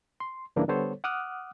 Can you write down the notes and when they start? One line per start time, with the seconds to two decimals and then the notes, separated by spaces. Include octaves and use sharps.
0.20 C6
0.56 G2 C#3 E3 A#3 D4
0.68 D3 G3 B3 A4 C5 C#5
1.04 F#5 D6 D#6 F6 F#6